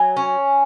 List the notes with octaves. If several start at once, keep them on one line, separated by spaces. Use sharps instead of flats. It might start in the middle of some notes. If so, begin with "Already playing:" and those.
Already playing: F#3 G#5
C#4